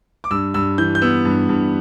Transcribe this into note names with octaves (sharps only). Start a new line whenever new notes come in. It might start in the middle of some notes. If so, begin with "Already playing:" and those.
D6
G2 E6
G2 E6
E3 G6
G6
B3 E6
G2
G2